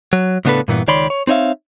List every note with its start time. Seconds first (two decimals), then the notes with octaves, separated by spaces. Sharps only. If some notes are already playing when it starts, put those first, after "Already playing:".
0.13 F#3
0.45 A2 C#3 B3 D4 A4 B4
0.68 G2 A#2 E3 B3
0.88 C#2 D#3 C#5 D5 B5 C6
1.10 C#5
1.27 C4 D#4 C#5 E5 F5